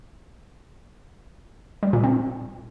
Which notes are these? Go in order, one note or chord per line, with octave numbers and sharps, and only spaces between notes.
G3
A#2
C4